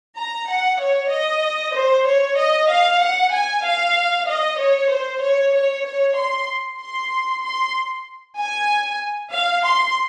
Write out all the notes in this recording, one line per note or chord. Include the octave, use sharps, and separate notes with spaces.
A#5
F#5
C#5
D#5
C5
C#5
D#5
F5
F#5
G#5
F5
D#5
C#5
C5
C#5
C#5
C#5
C6
C6
C6
G#5
F5
C6